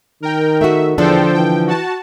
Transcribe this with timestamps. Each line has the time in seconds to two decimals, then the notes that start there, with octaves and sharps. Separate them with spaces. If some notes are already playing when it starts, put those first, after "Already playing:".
0.22 D#3 A#4 G5
0.61 A3 F#4 E5
0.98 E2 D3 F3 D4 A4 C5 G5
1.34 E3 G5
1.67 F#4 A5